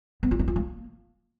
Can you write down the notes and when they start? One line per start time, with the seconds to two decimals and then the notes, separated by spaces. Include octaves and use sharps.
0.23 B3
0.31 F4
0.39 D#4
0.48 F4
0.56 A#3